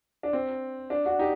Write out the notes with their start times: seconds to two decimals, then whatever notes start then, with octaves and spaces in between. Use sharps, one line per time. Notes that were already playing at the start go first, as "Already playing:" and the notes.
0.23 D4
0.33 C4
0.90 D4
1.06 D4 F#4
1.19 D#4 G4